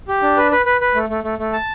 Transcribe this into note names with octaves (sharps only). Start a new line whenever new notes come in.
G4
D4
B4
B4
B4
B4
A3
A3
A3
A3
A5